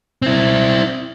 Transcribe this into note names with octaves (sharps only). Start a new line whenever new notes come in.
C4 E4